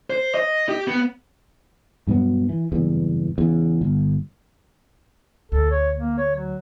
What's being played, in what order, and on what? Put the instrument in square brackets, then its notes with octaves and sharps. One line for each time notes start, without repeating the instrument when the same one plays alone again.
[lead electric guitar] C5
D#5
G4
B3
[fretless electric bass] G2 B2 F#3 B3
E3
F#1 E2 G2
E2 C#3
G1
[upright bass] D2 [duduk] A4
[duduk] C#5
A#3
C#5
F#3